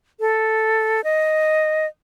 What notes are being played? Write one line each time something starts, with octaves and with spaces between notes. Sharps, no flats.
A4
D#5